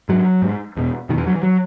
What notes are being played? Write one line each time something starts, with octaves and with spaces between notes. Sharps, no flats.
G#2 F#3
G#2
E2 B2
B2 D#3
E2 E3
F#3
E3
F#3